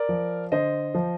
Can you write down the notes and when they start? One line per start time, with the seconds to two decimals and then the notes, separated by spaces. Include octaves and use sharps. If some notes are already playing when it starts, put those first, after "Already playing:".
Already playing: A#4 D5
0.09 F3
0.52 D3 C5 D#5
0.95 F3